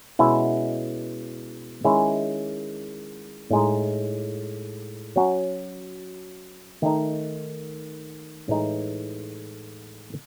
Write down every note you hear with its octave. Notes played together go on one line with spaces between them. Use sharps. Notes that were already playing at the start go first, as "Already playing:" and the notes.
B2 G#3 C#4 E4
D#3 G#3 C#4 E4
A2 G#3 D#4
F#3 C#4 F#4
D#3 A3 D#4
A2 E3 G#3 D#4